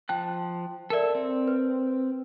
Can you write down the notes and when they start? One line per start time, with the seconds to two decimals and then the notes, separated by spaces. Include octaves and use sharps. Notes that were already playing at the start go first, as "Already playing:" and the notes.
0.09 F3 G5 A5 F#6
0.90 A4 A#4 D5 E5
1.15 C4
1.48 B4